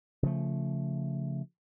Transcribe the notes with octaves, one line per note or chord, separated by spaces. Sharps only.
C#3 F3 A3